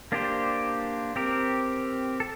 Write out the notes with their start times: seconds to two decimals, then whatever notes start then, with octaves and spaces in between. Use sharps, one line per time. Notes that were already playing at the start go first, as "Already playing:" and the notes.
0.12 A#3 D4 G4 C5
1.16 C4 G4 A#4
2.20 A4